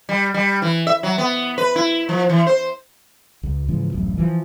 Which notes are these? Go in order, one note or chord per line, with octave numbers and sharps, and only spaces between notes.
G3
G3
E3
E5
F#3
B3
B4
E4
F3
E3
C5
C#2
G#2 C#3 E3 F3
D1 A1 F#2
E3 F3